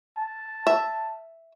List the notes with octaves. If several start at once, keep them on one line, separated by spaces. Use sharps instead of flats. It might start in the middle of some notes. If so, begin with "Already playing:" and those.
A5
E5